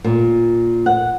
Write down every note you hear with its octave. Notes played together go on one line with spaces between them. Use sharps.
A#2
F#5